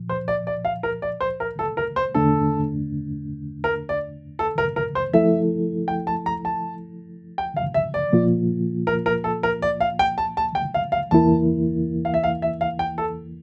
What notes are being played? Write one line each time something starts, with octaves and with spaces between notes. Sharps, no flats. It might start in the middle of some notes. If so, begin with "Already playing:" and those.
Already playing: A#2 F3
C5
D5
D5
F5
A#4
D5
C5
A#4
A4
A#4
C5
E2 D3 A3 D4 A4
A#4
D5
A4
A#4
A#4
C5
F3 A3 E4 A4 E5
G5
A5
A#5
A5
G5
F5
E5
D5
A#2 F3 A#3 F4
A#4
A#4
A4
A#4
D5
F5
G5
A5
A5
G5
F5
F5
E2 E3 A#3 E4 A#4 A5
F5
E5
F5
E5
F5
G5
A4